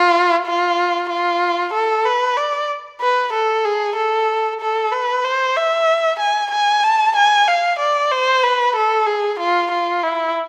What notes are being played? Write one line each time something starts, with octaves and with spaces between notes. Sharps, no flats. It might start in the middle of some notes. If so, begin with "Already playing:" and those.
Already playing: F4
F4
F4
A4
B4
D5
B4
A4
G#4
A4
A4
B4
C5
E5
G#5
G#5
A5
G#5
F5
D5
C5
B4
A4
G#4
F4
F4
E4